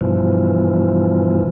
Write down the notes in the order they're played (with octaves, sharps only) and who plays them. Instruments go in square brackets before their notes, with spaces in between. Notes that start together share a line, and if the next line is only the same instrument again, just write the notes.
[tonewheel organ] G2 B2 E3 F3